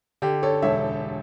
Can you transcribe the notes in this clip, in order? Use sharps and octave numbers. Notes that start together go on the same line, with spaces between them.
D3 G4
A4 C#5
E1 C#5 E5